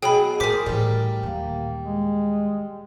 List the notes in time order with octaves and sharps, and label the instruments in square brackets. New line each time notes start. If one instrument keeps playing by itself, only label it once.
[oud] B2 F#3 G#4 [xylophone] G5 B5
[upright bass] A#2 [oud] F3 G#4 [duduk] A#4 [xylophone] D6 B6
[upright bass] A2 E3 [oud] G3
[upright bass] D#2 A#2 [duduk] A#3
[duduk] G#3